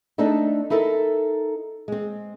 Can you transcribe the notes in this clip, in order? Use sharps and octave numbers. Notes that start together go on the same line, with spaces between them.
A3 C4 D4 D#4 A4
D#4 E4 A4 A#4 E5
G#3 C4